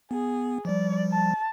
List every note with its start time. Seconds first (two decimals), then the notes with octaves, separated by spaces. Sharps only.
0.11 B3 G#4
0.65 F3 G3 D5
1.11 A5